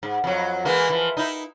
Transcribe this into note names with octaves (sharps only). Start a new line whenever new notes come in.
G#2
F2 F#3
E3 G#3 A#3
E3 F3
D#4 E4